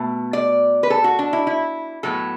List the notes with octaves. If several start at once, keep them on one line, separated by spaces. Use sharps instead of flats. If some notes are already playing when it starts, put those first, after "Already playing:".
Already playing: B2 A3
D5
B4
A4
F#4
D4
E4
E4
A2 F#3 B3 A4